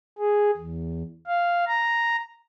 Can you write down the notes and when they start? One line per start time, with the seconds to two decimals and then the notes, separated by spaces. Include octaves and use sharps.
0.18 G#4
0.57 E2
1.27 F5
1.67 A#5